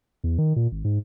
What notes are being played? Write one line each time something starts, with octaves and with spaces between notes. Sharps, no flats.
E2
D#3
A#2
G#1
G#2